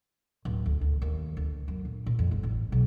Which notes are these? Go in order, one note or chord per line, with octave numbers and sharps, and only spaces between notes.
D1
D2
D2
D#2
D2
F#2
A#1
A#2
F2
G1
A1
B1